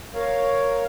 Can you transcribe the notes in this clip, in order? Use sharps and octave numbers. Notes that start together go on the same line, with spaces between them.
A#4 C#5 F5